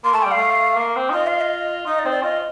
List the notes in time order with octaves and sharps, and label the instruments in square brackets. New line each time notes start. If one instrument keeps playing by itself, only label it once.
[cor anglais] A#3 [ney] C6
[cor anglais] A3 [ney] A5
[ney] G5
[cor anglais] G3
[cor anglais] A3 [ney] F5
[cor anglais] A#3
C4
D#4
[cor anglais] F4 [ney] D#5
[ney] F5
D#5
[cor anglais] D#4 [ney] D#5
[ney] D5
[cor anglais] C4 [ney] C5
[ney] D5
[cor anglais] F4 [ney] D#5